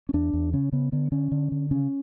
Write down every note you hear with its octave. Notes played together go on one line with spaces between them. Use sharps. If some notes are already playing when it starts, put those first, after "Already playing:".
C#4
E2 D4
E2
C#3 C#4
C#3 B3
D3 B3
D3 C#4
D3
D3
C#3 C#4